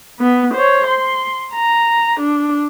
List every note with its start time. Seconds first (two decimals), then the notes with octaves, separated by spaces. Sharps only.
0.20 B3
0.54 C5 C#5
0.87 C6
1.54 A#5
2.20 D4